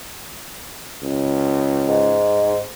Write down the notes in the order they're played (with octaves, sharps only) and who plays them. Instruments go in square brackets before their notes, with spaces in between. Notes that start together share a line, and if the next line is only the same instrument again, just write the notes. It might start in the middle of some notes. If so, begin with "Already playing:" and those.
[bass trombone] C#2
[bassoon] G#2